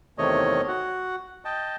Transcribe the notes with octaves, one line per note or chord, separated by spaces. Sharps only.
E2 C3 D#3 A3 C#5 D#5
F#4 F#5
D#5 G5 A5